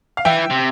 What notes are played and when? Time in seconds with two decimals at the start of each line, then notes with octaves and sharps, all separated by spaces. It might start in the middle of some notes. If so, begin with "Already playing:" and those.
0.17 F5
0.25 E3 E5 G5
0.50 C3